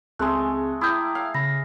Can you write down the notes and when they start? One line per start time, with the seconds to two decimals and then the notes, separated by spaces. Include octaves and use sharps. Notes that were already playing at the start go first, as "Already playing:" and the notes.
0.19 C#2 G#3 A3 C4 G#4 C6 F#6
0.81 E4 G5 A#5 D6 D#6 G6
1.15 F5
1.34 C#3 B5 A#6